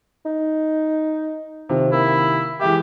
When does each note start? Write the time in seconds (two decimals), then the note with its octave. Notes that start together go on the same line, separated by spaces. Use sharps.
0.25 D#4
1.69 C3 D#3 F3
1.92 A#3 E4
2.61 E3 G#3 G4 E5